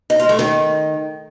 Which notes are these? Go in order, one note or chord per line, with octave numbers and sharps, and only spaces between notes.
D#4
F4
A3
D#3